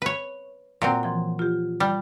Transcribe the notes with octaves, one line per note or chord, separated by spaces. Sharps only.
B4 C#5
A#2 F#3 C4
E3 F3 C6
F4 G4
G3